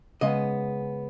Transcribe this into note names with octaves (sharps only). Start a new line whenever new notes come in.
C#3 G#3 B3 D#5